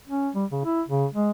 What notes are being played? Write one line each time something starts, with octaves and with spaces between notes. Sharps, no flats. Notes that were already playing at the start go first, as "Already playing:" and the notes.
C#4
G3
C#3
E4
C#3
G#3